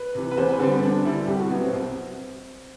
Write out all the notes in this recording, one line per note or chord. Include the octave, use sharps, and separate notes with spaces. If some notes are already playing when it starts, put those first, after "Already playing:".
Already playing: B4
C3 E3
B4
E2 C5
B4
D3 G3 C4
B3
E2 D4
D3 G3 E4
C2 G4
F#4
B2 F#3 B3
C4
C2